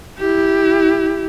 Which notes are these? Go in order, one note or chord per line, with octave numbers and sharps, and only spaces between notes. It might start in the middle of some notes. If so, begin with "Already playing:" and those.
E4 G4